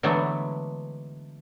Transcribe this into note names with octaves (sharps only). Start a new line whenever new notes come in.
D3 E3 F#3 G#3 A3 B3